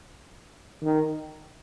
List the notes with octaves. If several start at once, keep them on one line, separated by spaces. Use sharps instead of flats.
D#3